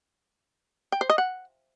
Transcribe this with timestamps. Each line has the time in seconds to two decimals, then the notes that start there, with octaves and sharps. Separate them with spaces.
0.92 G5
1.01 C5
1.10 D#5
1.18 F#5